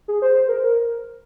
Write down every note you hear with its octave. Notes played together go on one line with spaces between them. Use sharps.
G#4
C5
C5
A#4
A#4